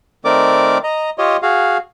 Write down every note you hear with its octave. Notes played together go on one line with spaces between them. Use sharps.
D#3 A3 C4 A#4 D5 D6
D#5 A#5
F4 G4 C#5 D#5
F#4 G#4 F5